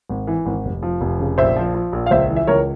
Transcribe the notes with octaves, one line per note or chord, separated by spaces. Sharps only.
G#1
E3
G#1
F1
F3
F1
C#3
A#1 C5 E5
F3
F3
A#1
F5
C#2 C5 E5
E3
E5
C#2 A#4 C#5